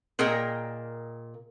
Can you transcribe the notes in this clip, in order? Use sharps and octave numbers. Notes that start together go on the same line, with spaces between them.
A#2 G#4 A#4 D#5 G5